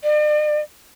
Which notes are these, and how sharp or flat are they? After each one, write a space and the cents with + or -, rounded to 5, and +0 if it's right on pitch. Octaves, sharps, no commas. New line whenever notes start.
D5 +45